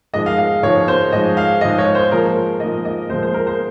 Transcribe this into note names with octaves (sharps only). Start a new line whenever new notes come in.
G#2 F3 G#3 D#5
F5
F5
G#2 F3 G#3 C#5
C5
G#2 F3 G#3 D#5
F5
G#2 F3 G#3 D#5
C#5
C5
A#2 F3 G#3 A#4
A#2 F3 G#3 D#5
D#5
A#2 F3 G#3 C5
C5
A#4
C5